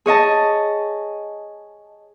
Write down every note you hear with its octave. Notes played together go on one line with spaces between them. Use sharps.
G#4 C#5 D#5 A5